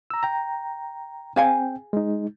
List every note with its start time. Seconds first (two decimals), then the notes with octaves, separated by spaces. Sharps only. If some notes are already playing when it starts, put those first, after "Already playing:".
0.10 A#5 E6
0.23 G5 A#5
1.36 C4 G#4 F5 G5 G#5
1.93 G#3 D#4